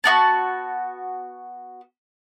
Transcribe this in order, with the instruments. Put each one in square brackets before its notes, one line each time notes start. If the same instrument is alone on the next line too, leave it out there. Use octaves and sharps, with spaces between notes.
[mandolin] B3 D#4 F#4 A5